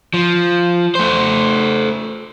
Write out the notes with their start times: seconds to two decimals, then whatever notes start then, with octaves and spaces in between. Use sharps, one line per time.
0.14 F3
0.95 A3 C5